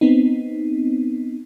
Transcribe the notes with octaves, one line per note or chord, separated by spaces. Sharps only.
B3 C4 D#4